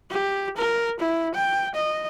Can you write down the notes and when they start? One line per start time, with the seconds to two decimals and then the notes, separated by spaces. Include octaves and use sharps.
0.11 G4
0.57 A#4
1.00 E4
1.35 G5
1.75 D#5